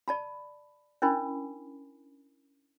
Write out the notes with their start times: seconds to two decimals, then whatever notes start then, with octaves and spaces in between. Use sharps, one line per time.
0.08 D5 A5 B5
1.02 C#4 D4 E4 A#4 G#5 B5